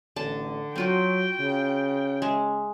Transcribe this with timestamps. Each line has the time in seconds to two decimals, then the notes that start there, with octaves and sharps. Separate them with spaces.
0.16 A1 D3 A5
0.76 F#3 C4 F4 F#4 G5
1.40 C#3
2.22 G#3 E5